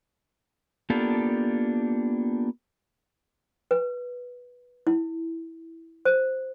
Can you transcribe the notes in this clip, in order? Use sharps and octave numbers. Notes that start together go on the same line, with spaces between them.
A#3 B3 D4 F4 G4 A4
B4
E4
C5